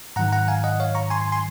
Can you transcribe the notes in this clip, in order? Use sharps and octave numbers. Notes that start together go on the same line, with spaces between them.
G#2 D#3 F#3 F#5 A#5
F#5 A#5
F5 G#5
D#5 F#5
C#5 F5
A#5 C#6
G#5 C6
G#5 C6
G#5 C6